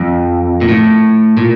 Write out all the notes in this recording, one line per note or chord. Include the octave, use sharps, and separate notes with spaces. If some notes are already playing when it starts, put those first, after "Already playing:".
Already playing: F2
A#2
A2
A#2